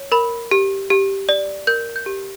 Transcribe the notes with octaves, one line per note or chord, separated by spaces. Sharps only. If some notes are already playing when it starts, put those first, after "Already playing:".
Already playing: C#5
A#4 B5
G4
G4
D5
A#4 G6
G6
G4